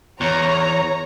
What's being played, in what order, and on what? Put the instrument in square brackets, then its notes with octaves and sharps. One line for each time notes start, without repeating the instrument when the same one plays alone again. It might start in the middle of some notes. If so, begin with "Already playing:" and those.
[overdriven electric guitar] E2 [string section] C#5 A#5